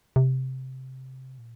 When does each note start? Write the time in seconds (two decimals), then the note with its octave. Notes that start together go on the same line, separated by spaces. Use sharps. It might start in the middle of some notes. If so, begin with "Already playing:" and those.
0.16 C3
1.38 A#2